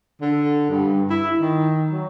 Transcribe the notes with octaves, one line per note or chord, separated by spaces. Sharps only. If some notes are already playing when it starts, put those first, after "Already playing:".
D3
G2
E4
D#3
F#3